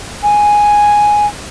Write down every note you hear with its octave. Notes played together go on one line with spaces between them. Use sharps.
G#5